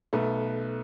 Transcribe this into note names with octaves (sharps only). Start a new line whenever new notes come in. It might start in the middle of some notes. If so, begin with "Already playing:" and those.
B1 A3 B3